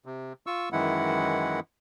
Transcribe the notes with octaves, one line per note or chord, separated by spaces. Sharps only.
C3
F4 C#6 E6
F#2 D#3 E3 G#3 E4 F#5